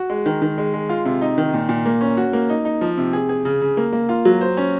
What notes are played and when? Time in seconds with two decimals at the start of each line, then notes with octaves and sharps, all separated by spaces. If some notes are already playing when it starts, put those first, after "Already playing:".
Already playing: F#4
0.10 G#3
0.26 D#3
0.42 D#3
0.58 G#3
0.74 G#3
0.89 F4
1.05 C3
1.21 D#4
1.38 D#3
1.54 A#2
1.69 A#2
1.86 A#3
2.01 C#4
2.17 F#4
2.33 A#3
2.50 D#4
2.65 D#4
2.81 F3
2.98 C3
3.13 G#4
3.29 G#4
3.45 C#3
3.62 C#3
3.77 A#3
3.93 A#3
4.09 F4
4.25 F#3
4.41 C5
4.57 C#4